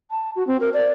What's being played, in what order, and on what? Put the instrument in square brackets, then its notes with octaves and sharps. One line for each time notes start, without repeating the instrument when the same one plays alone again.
[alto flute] A5
F#4
C4
A#4
D5